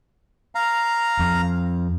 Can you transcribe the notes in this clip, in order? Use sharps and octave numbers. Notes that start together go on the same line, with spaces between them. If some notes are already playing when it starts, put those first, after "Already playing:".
F5 A#5
F2